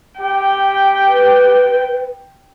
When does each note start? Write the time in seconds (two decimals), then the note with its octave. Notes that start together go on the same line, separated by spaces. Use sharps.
0.20 G4 G5
1.08 B4